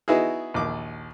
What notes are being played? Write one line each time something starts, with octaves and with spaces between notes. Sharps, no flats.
B3 D#4 E4 F#4 G#4
A#1 D#2 D6